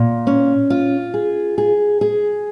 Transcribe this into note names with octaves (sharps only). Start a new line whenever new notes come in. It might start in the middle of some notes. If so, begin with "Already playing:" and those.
Already playing: A#2
C#4
F4
G#4
G#4
G#4